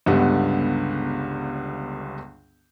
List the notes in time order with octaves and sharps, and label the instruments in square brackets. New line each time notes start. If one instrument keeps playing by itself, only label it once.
[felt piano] G1 C#2 D3 G3 B3